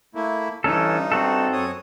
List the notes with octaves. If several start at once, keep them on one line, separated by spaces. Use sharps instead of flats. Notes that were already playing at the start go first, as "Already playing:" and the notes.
A3 A#3 E4
G2 E3 C#4 D#4 A4
C4 F#4 A4
F#2 C#5 D#6